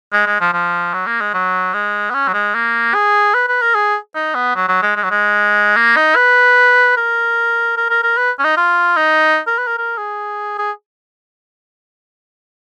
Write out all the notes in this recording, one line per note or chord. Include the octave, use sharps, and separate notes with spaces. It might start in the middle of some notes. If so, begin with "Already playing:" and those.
G#3
G#3
F3
F3
F#3
A#3
G#3
F#3
G#3
B3
C#4
F#3
G#3
A#3
G#4
B4
B4
A#4
G#4
D#4
B3
F#3
F#3
G#3
G#3
F#3
G#3
A#3
D#4
B4
A#4
A#4
A#4
A#4
B4
C#4
D#4
F4
D#4
A#4
B4
A#4
A#4
G#4
G#4